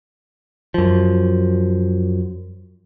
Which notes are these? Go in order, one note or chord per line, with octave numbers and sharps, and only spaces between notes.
F#2 F3